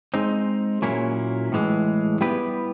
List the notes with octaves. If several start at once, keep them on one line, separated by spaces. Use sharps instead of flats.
G#3 C4 D#4
A#2 F#3 A#3 C#4 E4
A2 E3 G#3
G3 B3 E4 G4 B4